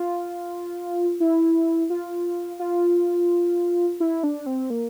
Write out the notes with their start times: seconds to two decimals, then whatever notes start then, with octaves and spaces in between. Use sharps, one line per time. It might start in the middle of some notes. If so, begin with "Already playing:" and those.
Already playing: F4
1.20 E4
1.90 F4
2.59 F4
4.00 E4
4.23 D4
4.46 C4
4.70 A#3